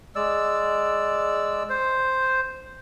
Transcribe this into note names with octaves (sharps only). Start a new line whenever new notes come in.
G#3 D5 E6
C5